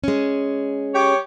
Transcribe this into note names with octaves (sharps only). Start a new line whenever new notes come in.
G#3 C#4
G4 C#5